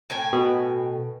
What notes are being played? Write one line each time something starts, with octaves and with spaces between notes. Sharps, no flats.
A2 G5 G#5
B2